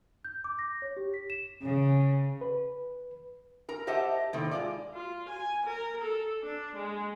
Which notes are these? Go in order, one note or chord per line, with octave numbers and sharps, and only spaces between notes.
G6
D6
A#6
C#5
G4
B6
E7
C#3
B4
A#4 A#5
G4 C5 D#5 E5 F#5 A5
A2 C3 D#3 A#3 C4
G#3 F4 D5
F4
G#5
A#4
A4
D4
G#3